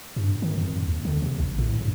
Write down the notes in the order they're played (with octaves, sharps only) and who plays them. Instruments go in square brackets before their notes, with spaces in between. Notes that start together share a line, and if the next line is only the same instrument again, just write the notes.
[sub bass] G2
D#3
F2
D#2
D3
C3
A#1
A2
G2